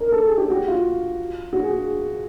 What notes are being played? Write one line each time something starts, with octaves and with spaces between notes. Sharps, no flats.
A#4
A4
G#4
G4
F#4
F4
F#4
G#4